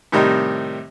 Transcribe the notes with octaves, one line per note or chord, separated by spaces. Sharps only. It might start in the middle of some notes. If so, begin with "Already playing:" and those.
A2 C3 D#3 G3 D#4